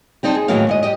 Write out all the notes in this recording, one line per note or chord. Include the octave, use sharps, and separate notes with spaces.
G3 C4 D#4 C5 A5
G#4
A2 D#3 E3 F#3 A#3 F5
D#2 G#2 D#5
G3 G4 D#5